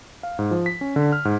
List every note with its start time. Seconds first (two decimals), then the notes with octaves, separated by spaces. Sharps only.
0.23 F5
0.39 G#2
0.51 F3
0.66 B6
0.81 C#4
0.96 D3
1.12 F6
1.25 G#2